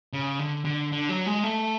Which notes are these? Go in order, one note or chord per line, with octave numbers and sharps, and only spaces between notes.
C#3
D3
D3
D3
F#3
G#3
A3